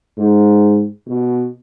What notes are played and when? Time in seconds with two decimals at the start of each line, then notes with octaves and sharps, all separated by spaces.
0.18 G#2
1.07 B2